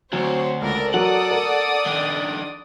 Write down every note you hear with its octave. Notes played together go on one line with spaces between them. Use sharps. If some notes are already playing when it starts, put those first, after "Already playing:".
D2 F#3 C4 C5 C#5
C#2 A4 A#4 D5
F#3 A#4 D5 F#5 D#6
A#4
D#3 D4